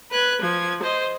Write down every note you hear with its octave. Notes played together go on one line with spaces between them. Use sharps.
B4 F#6 G#6
F3 G#6
C5 D#5